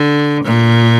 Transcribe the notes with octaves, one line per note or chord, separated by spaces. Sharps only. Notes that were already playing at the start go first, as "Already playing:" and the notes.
Already playing: D3
A#2